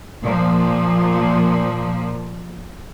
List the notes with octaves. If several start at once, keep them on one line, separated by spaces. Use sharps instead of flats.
A#2 F3